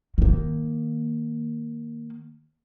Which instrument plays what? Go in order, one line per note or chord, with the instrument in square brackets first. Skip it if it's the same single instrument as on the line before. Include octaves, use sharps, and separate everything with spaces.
[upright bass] D#3 A#3